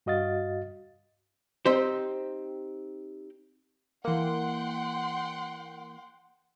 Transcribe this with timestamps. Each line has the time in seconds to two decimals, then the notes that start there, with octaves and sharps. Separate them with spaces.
0.06 G2 F#4 D#5 F5 A6
1.65 C4 D#4 G4 C5
4.05 E3 A#3 F#5 G5 C6